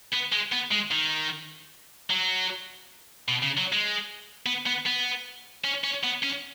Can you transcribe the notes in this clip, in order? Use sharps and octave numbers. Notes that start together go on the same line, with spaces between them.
B3
G#3
B3
G#3
D#3
F#3
B2
C#3
F#3
G#3
B3
B3
B3
C#4
C#4
B3
C#4